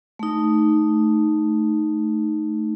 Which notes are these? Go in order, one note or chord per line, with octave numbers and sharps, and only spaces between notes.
A3 D#4